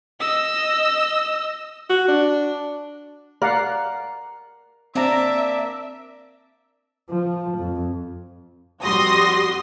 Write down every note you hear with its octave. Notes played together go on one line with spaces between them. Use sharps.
D#5 E6
F#4
D4
A#4 D5 F5 F#5
A#3 C4 D4 E5 A#5
F3
F2
F2 G3 F#4 C6 D#6 A#6